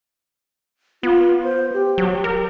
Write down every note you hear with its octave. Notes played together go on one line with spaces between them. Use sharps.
B3 F4
C5
G4
F#3
A#4